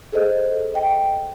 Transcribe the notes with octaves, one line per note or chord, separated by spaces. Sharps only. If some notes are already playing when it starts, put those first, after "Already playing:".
G#4 A4 C5 D#5
D#5 G5